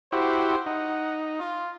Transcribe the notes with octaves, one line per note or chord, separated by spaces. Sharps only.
E4 F#4 G4 C5
D#4 F#5
F4